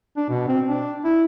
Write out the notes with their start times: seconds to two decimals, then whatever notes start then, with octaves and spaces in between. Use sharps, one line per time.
0.17 D4
0.29 B2
0.48 C4
0.68 D4
1.04 E4